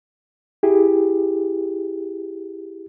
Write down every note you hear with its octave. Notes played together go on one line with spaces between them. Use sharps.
E4 G4 G#4